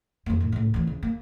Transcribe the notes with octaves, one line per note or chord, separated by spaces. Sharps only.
F2 A#3
A2
C#2 A2
D2 E3
C#3
A#3